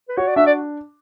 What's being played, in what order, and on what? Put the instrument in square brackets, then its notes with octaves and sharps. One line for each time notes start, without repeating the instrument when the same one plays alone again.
[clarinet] B4
[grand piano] F#4 [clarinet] C#5
[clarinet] D5
[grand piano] D4 [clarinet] E5
[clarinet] D5